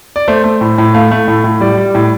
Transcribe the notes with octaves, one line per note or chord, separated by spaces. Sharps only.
D5
A3 C5
A3
A2
A2
A3 F5
A3
A2
A2
G3 D5
G3
A2